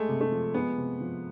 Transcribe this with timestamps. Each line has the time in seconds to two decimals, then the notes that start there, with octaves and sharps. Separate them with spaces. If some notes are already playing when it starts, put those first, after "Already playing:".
Already playing: G#3 A3
0.09 C3
0.21 A3
0.32 F3
0.54 G#3 B3
0.77 C3
1.00 F3